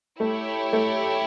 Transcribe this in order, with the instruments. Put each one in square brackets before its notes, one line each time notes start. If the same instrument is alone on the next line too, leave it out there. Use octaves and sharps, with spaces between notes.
[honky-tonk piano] A3 [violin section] E4 G4 C#5
[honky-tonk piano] A3